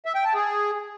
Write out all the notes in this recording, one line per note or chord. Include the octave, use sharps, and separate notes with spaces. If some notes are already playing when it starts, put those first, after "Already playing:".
E5
G5
A5
G#4